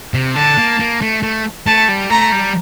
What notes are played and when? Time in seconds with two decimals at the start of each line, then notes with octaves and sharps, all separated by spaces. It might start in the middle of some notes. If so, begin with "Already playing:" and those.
0.14 C3
0.35 D3 A5
0.57 A#3
0.80 A#3
1.01 A3
1.23 A3
1.67 A3 A5
1.88 G3
2.10 A3 A#5
2.32 G3